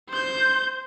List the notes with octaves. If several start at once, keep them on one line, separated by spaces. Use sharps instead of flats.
C5 G6